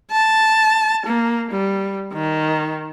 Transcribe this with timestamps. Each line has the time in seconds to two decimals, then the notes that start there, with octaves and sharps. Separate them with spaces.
0.11 A5
1.06 A#3
1.51 G3
2.13 D#3